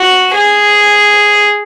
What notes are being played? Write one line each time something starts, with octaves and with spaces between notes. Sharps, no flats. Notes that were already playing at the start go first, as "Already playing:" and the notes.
Already playing: F#4
G#4